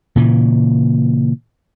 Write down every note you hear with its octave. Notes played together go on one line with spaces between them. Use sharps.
A#2 C#3 E3